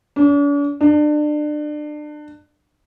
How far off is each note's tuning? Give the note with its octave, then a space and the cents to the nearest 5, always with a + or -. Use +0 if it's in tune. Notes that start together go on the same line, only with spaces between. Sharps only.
D4 -45
D4 +30